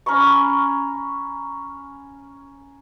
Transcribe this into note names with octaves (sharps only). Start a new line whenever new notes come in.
C#4 A#5 B5 C#6